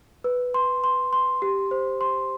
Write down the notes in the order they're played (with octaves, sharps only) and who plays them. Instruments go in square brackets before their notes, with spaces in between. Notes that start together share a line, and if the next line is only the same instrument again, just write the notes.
[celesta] B4
C6
C6
C6
G4
C5
C6